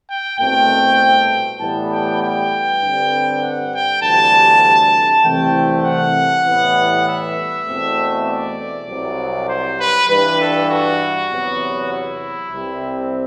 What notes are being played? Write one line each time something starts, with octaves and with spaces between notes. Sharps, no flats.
G5
C2 B2 A3 C4 G5
A2 E3 G3 B3 A5
G5
G5
G2 D3 G3 C4
F#5
G5
D2 C3 E3 G3 A5
C2 C3 E3 A3 C4 G5
F#5
A2 E3 G3 B3
E5
E2 B2 A3 C4
D5
C2 C3 F#3 C4
C5
B4
G2 E3 G3 B4
A4
F#4
E2 C3 F#3 B3
E4
C2 C3 G3 C4